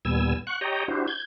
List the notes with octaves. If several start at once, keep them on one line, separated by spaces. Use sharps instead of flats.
D#2 A#2 G3 B3 G#5 E6
F#5 C#6 F#6
G4 C#5 D#5 G5 A#5
D4 E4 F#4 G4 C5
G6 G#6